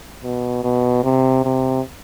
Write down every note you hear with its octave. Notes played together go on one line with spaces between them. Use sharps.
B2
B2
C3
C3